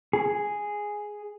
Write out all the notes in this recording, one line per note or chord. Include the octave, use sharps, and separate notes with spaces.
G#4